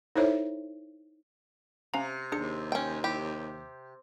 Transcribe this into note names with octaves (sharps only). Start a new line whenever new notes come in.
D#4 E4 A4 C5 C#5 E5
C3 C#4 F5 A#5
D#2 D4 G#4 C#7
C#4 G5
E4 G4